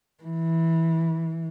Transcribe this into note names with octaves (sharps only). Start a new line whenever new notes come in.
E3